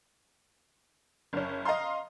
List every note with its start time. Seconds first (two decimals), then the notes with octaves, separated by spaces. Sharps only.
1.33 F#1 C#4
1.65 D#5 F5 A#5 C6